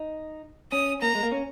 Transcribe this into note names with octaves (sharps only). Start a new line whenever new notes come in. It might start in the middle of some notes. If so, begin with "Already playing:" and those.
Already playing: D#4
C#4 D#6
A#3 A#5
G#3
A#3
C#4